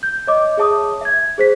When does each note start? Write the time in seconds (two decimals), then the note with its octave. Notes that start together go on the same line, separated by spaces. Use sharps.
0.03 G6
0.27 C#5 D#5 D6
0.57 G#4 C#5 E5 A5 D6 D#6
1.01 E5 G#6
1.38 G#4 C5 B6